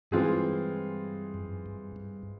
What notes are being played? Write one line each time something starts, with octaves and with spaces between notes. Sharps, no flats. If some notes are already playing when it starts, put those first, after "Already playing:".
G2 E3 G#3 C4 F4 G#4
F#2
G2
G2